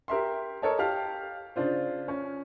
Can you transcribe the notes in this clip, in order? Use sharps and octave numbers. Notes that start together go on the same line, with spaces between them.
G4 A#4 E5 C6
A4 A#4 C#5 D#5 A5
G4 F5 A5 F6
C#3 D4 F4 C5
C#4